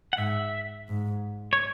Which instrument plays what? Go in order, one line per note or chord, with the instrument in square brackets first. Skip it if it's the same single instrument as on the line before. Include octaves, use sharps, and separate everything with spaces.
[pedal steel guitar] F#5
[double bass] G#2 [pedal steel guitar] E5
[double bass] G#2
[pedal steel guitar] C#5